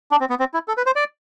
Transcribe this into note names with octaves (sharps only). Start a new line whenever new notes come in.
D4
C4
B3
C4
E4
A4
B4
C5
D5